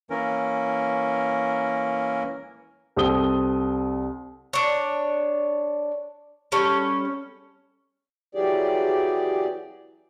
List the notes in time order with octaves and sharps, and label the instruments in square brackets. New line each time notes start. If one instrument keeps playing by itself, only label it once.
[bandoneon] E3 A#3 C#4 A#4
[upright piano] C2 C4 A4 D#6 G7
[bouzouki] D4 C#5
G3 C#4 A4
[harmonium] E3 F#3 G4 G#4 D5